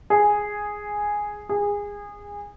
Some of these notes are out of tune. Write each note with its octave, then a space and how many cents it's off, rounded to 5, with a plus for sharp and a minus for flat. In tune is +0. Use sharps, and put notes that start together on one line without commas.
G#4 -5
G#4 -25